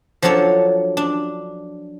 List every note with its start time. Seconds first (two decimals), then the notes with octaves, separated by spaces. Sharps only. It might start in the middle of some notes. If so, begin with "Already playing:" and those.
0.22 F3 F#3 D4 A4 C#5
0.97 D4